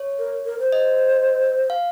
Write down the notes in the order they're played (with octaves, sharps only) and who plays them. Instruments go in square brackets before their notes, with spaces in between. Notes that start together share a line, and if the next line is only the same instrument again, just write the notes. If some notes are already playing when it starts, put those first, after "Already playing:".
Already playing: [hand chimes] C#5
[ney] A#4
A#4
C5
[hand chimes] D#5
F5